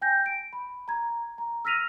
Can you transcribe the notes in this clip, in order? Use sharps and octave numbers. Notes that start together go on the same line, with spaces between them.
G5 G#5 G6 A#6
D7
B5
A#5 G#6
A#5
E6 F6 A#6 B6 D#7 F7